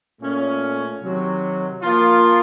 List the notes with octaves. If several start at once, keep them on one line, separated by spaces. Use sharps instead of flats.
A#2 A3 C#4
C3 D#3 F#3
F3 A#3 F4